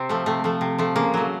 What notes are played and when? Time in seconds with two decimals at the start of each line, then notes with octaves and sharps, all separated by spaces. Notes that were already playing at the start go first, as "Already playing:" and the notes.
Already playing: C3 C4
0.09 F3 A3
0.26 C3 A3
0.44 F3 A3
0.61 C3
0.79 F3 A3
0.96 C#3 A#3
1.14 F#3 A3